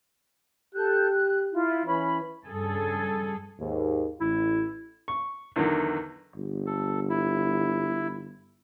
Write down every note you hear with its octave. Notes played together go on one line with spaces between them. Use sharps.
G4 A4 F#6 G6
F#6
E4 F4
E3 C#4 B5
G2 C#3 G#4 A4
D#2 G#2
A1 E4
C#6
E2 D3 D#3 F#3
G1
A4
E4